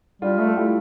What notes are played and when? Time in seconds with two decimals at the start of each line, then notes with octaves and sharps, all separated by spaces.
0.22 G3 D4 F4
0.40 A3
0.48 A4
0.57 E4 G4